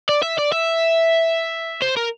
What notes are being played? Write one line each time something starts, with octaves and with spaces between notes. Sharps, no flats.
D5
E5
D5
E5
C5
A#4